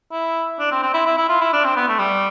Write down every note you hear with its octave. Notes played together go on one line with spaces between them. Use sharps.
E4
D4
C4
C4
E4
E4
E4
F4
E4
D4
C4
B3
A3
G3